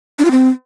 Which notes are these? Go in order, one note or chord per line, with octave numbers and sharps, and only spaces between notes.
D4
F4
C4